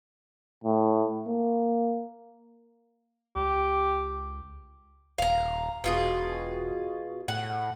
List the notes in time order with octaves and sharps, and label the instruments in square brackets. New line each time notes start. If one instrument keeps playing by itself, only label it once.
[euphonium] A2
A#3
[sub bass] C#2 [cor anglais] G4
[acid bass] D#1 [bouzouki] F5 A#5
[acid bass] E1 [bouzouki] B2 F4 G#4
[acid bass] A2 [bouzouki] F#5